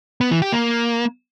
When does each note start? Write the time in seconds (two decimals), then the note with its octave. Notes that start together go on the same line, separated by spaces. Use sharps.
0.21 B3
0.31 E3
0.42 G4
0.52 A#3